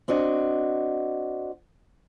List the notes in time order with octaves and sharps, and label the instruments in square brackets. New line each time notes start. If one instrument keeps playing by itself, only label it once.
[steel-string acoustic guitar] C4 D4 F#4 D#5